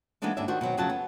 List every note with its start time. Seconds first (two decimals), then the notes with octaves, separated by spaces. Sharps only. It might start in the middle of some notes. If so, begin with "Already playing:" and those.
0.22 E3 G#3 A#3 B3 D4 D#4
0.37 D#2 G#2 D4 E4 E5
0.48 D#3 D4 F#4 C5
0.61 B2 D#3 F#3 C4
0.77 F2 C#3 F#3 F#5 A5
0.90 B3